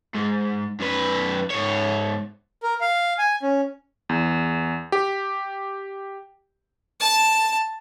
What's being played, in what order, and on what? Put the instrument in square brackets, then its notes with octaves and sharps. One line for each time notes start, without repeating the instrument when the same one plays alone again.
[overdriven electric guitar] G#2
F#2 B4
G#2 C#5
[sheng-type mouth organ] A#4
F5
G#5
C#4
[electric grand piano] E2
G4
[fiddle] A5